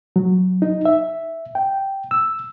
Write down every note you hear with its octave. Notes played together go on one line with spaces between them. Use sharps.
F#3
D#4
E5
G5
E6